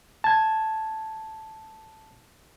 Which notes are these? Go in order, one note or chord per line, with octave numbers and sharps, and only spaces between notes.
A5 G#6